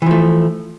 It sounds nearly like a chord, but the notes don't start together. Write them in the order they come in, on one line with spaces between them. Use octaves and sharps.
E3 F3 A3